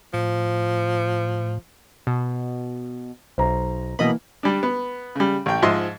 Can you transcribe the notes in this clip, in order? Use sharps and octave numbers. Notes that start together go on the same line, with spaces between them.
A2 F3
B2
B1 C5 A#5
B2 E3 A#3 D#5 B5
G3 D4
B3
C#3 G3
A1 G5
G#2 F3 D#5 E5 C6